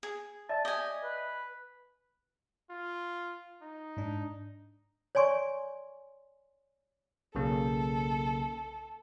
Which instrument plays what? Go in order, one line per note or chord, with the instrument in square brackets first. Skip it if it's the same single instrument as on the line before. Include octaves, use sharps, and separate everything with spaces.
[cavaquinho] G#4
[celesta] D5 E5 [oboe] A5
[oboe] G4 [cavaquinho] D#5 G#5
[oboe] B4
[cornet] F4
D#4
[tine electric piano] G#2 D4
[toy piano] C#5 D5 G#5 C6 C#6
[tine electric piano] B1 C#3 A#3 [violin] A4